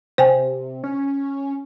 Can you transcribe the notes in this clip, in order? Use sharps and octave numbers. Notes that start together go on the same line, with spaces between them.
C3 C5 G5 G#5
C#4